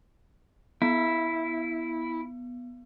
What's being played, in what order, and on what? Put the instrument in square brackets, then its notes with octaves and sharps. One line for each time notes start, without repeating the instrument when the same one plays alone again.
[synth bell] B3 [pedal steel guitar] E4